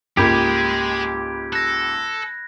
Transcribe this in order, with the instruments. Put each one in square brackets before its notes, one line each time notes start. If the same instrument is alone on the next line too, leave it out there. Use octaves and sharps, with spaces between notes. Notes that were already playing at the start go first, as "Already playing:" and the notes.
[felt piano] C#2 G#2 A#3 [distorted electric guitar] G#3 [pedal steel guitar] G4 [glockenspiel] B5 G6 G#6
[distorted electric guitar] A4 [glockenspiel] F#6 A#6